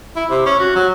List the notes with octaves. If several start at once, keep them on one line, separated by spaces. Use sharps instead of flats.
E4
C3
C#4
F#4
F#3